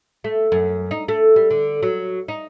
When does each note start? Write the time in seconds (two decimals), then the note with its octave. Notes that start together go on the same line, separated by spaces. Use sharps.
0.24 A3
0.52 F#2
0.91 D#4
1.08 A3
1.36 G3
1.50 D3
1.83 F#3
2.28 D#4